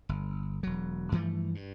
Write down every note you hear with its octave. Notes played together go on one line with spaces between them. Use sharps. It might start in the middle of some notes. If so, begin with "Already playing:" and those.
G1
E1 F#3
G2 E3 F3 A3
G2